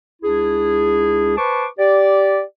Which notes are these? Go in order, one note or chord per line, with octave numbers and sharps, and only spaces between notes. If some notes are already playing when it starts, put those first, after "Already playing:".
C#2 D4 E4 G#4
B4 C5 A5 C#6 D6
G4 D5